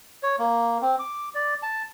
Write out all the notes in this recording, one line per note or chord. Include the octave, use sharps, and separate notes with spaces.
C#5
A#3
C4
D6
D5
A5